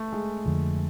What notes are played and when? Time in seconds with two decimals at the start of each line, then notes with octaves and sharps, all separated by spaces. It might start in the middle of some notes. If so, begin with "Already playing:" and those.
Already playing: A3
0.12 G#3
0.45 F2 D3 F3